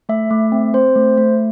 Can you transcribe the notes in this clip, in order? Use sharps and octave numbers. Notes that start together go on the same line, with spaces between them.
A3 E5
A3
C4
C4 C5
A3
A3